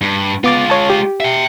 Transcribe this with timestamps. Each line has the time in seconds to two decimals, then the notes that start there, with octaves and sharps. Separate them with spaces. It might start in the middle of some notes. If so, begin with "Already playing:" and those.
0.01 G2
0.44 G#3 B3 F4 D6 A6
0.70 C#5 A5
0.90 G4
1.20 E5 G5